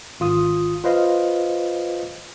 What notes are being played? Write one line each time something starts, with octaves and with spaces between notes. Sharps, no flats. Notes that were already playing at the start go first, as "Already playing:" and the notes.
G#1 F4 D#6
F4 B4 C5 D#5 F5